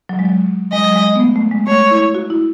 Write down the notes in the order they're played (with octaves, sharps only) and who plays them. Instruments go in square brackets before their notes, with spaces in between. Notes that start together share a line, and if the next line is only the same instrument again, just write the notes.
[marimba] F#3
G#3
F#3
[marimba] G#3 [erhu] D#5
[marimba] F#3
G#3
B3
A3
A3
G#3
[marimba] A3 [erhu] C#5
[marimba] E4
F#4
E4